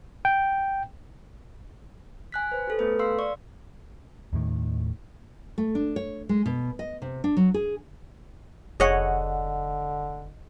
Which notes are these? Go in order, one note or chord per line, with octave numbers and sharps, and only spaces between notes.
G5
G#5 F#6 B6
B4 C5
G4 A4
A3 B3 G#4 A4 B4
F5 C6 E6 C7
D5 C#6
D#2 A2 D#3
A3
D4
C#5
G#3
B2
D#5
C3
D4
F#3
G#4
F1 D3 G#4 C#5 D#5 F#5